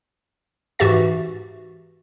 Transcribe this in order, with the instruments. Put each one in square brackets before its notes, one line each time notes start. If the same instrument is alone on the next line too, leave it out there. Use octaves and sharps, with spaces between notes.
[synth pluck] G#2 E3 F#4 G4 E5 A6